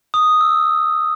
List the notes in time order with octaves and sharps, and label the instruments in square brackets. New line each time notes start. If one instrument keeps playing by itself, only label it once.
[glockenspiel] D#6
E6